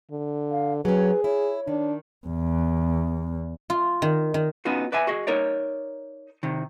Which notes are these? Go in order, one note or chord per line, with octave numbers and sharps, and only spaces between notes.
D3
F5
F#3 C#4 G#4 B4
E4 C#5
D#3 D4
E2
F4
D#3
D#3
B3 C#4 D#4 F4 F#4
B4 D5 E5 G#5
F#4 G#4 D#5
D#4 A#4 C#5 D5
C3 D#3